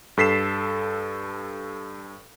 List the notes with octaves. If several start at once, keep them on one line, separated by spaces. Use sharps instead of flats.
G2 A4 B6 C7 E7